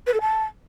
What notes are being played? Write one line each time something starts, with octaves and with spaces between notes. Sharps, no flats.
B4
A4
A5